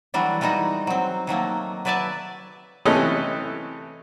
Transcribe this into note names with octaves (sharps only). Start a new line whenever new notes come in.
E3 F#3 G3 A3 D4 F#4
E3 G3 G#3 D#4 F#4
F#3 C4
D#3 F#3 A3 A#3
F#3 B4 D5 E5 G#5 A5
C3 E3 A3 C#4 A4 D#5